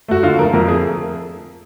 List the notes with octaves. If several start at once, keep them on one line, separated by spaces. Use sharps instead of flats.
A3 F#4
D3 F4
F3 A#4
F2 A#4
A3 G#4